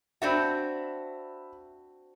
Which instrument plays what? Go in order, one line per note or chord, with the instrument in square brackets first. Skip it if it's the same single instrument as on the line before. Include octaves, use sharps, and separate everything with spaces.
[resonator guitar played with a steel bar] C4 D4 F#4 [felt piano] E5 B5